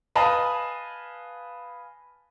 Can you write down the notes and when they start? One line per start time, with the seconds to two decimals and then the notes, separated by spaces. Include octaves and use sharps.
0.15 B4 D#5 F5 G#5 A5 B5